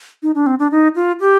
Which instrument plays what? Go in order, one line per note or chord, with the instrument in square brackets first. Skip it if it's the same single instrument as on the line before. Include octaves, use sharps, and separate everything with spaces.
[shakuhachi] D#4
D4
C4
D4
D#4
F4
G4